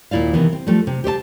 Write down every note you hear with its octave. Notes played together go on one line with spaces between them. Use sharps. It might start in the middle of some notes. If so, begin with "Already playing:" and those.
D#2 A#2 E4 D5 F5
C3 D#3 E3 B3
C4
F3 G3 A3
C3
G4 C5 C#5 A5